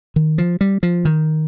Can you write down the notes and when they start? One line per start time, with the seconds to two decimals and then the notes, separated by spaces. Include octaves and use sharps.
0.16 D#3
0.38 F3
0.61 G3
0.83 F3
1.05 D#3